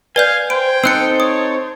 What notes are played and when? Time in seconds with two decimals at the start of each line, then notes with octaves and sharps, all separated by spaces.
0.16 B4 D5 F5 G#5 G6
0.50 C5 G5 D7
0.84 C4 D#4 A4 C5 E6 F#6 C#7
1.20 C#5 D#6